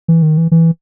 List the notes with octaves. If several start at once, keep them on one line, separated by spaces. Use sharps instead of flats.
E3
D#3
E3
E3